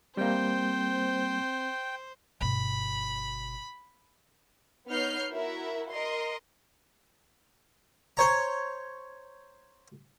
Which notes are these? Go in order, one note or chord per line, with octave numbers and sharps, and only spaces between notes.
G3 A#3 C4 C5 G5
G1 B2 B5
B3 D#4 C#5 F6 G6 C7
E4 F#4 A#4 E5
A#4 D#5 C6
C5 C#5 A#5